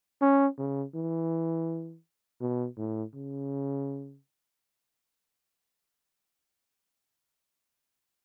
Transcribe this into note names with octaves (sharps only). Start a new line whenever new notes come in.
C#4
C#3
E3
B2
A2
C#3